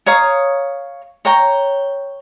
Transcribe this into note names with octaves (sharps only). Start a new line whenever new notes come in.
C#5 F5 A#5 D#6
C#5 G5 A#5